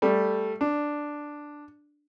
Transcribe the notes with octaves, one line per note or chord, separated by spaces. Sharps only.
G3 A3
D4